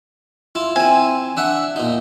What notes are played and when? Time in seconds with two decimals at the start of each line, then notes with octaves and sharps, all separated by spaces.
0.55 E4 F4
0.76 C4 E4 G#5
1.37 D4 E5 F#5
1.76 A#2 D#4